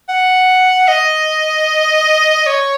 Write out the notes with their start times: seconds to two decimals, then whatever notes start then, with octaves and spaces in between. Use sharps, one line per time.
0.09 F#5
0.88 D#5
2.46 C#5